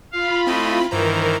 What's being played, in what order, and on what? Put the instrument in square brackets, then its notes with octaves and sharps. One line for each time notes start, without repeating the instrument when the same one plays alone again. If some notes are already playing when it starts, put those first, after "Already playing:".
[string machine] F4 B5 [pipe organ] F5
[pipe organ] A3 D#5 [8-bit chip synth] C4 E4
[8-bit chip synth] G2 C5 A#5 [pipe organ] D#3 E3 [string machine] A#4